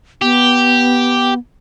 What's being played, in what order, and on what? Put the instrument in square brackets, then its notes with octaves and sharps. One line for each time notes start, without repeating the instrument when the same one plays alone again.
[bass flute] B3 [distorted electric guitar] G4